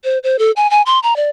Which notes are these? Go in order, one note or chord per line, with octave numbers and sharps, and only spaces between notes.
C5
C5
A4
G#5
G#5
C6
A#5
D5